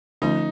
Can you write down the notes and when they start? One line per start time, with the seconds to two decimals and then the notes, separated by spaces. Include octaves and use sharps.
0.22 D3 F3 A3 C#4 D#4 F4